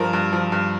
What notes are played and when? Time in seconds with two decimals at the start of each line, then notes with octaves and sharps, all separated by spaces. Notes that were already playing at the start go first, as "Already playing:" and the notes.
Already playing: G2 F3 A#4
0.13 G2
0.33 F3
0.52 G2